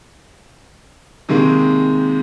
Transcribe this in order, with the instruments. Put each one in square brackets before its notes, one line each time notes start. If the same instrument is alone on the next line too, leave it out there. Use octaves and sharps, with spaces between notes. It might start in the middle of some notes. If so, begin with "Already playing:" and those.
[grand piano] C3 D#3 G#3 A#3